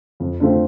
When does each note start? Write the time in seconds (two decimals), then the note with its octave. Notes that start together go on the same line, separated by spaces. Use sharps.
0.20 F2
0.40 D3 A3 C4 F4